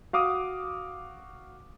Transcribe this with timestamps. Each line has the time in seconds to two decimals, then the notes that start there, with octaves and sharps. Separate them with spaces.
0.13 F#4 F5 D6 D#6